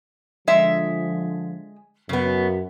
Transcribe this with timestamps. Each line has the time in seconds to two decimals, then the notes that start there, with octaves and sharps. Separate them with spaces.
0.47 D3 F3 G#3 E5
2.09 F#2 C#3 B3